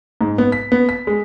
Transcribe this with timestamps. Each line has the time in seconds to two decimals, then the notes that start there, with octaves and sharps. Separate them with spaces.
0.21 G#2
0.38 B3
0.52 B6
0.72 B3
0.89 B6
1.07 G#3